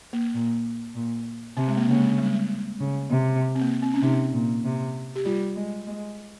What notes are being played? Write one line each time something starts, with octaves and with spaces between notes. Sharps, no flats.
A#3
A#2
A#2
C3 C4
G#3
A#3
C#3 A#3
G#3
G3
G#3
G3
C#3
C3
C4
A#3
C4
C#4
C3 D#4
A#2
C3
G4
G3 F4
G#3
G#3